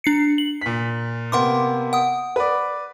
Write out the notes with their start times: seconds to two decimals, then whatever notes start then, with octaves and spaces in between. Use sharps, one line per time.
0.04 D4 C7 C#7
0.38 F#7
0.61 A#2 B6
1.32 C3 A#3 B3 F#5 C6 D6
1.93 F#5 D#6
2.36 B4 D5